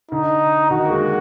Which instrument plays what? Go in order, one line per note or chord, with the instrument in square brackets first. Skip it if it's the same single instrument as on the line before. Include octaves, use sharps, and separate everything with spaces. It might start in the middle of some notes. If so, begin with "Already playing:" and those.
[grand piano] D3 [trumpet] D#4
[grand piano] D#3 [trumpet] F#4
[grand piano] A#3
G#3